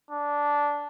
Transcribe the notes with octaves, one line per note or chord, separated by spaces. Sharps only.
D4